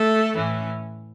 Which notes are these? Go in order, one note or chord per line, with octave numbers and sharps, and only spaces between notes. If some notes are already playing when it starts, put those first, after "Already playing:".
Already playing: A3 A4
A2 E3 C#4